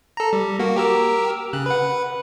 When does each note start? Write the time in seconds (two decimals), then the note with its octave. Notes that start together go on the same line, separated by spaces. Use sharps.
0.17 A4 A#5
0.33 G3
0.59 A#3 F#4
0.76 G4 A#4 E6
1.53 C#3 F#6
1.66 B4 F#5